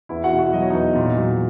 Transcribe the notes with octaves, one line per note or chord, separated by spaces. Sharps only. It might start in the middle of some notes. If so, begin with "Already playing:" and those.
E2 E4 E5
F#4 F#5
B2
F#4 F#5
F#3 D#5
C#5
E2 D#4 D#5
A#2
F#3